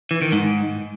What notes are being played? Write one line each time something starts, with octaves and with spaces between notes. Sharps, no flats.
E3
D#3
G#2